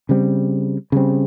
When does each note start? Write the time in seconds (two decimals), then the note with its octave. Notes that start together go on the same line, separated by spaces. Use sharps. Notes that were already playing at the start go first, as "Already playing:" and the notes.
0.09 C#3 G3 C4
0.92 C#3 G3 C4